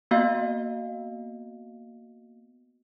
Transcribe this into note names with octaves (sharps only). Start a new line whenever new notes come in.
A#3 B3 F#4 D#5 F5